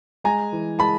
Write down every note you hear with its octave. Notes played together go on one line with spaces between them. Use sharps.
G#3 G#5 A#5
E3
G#3 A5 B5